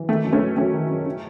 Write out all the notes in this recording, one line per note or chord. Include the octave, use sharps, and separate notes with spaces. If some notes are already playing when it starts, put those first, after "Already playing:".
Already playing: E3
D#3 A3
F#2
A3 C#4
F#2
F#3 A3 C#4
D#3
F#2
C#3